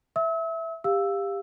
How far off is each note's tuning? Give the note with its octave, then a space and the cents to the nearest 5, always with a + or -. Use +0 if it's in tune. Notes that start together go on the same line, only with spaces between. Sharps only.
E5 +0 E6 -40
G4 +20 F5 +0 E6 +0